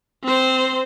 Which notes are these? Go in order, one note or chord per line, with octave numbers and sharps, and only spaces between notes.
C4 C5